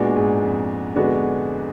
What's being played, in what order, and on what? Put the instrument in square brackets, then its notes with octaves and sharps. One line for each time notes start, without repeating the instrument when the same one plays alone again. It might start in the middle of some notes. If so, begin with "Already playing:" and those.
Already playing: [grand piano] A#2 [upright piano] G#3 B3 D4 F#4
[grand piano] G#2
F2
[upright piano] D3 G#3 B3 D4 F#4